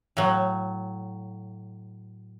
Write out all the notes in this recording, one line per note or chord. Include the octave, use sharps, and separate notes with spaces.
A2 F#3